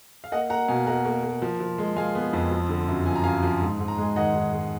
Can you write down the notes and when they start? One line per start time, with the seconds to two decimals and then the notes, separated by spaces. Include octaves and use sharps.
0.24 F5
0.32 A#3 D#5 F#5
0.50 A#3 F#5 A#5
0.68 B2 F5 G#5
0.87 A#3 F#5 A#5
1.05 A#3
1.23 A#3
1.42 F3
1.60 F3
1.78 G#3
1.96 G#3 F5 G#5
2.15 B3
2.33 F2
2.51 F3
2.69 D3
2.88 F#2
3.06 F3 G#5
3.16 A#5
3.24 F#2 F5 G#5
3.43 F3
3.62 G#2
3.80 G#2
3.88 A#5
3.98 G#3 G#5
4.16 D#3 D#5 F#5
4.35 D#3
4.53 G#3